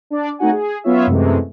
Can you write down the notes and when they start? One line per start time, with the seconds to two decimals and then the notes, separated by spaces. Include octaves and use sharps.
0.10 D4 D5
0.39 A3 C4 D#4 F#4 F#5 G#5
0.51 G#4
0.84 F#3 B3 C#4 F4 C#5 E5
1.07 F#2 C3 E3 G#3 A3